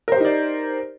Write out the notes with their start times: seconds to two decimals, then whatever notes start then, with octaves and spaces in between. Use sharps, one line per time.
0.08 A#4
0.12 C5
0.16 G4
0.20 D#4
0.25 D5